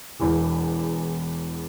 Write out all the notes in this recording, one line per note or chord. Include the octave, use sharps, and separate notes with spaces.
E1 E2 E3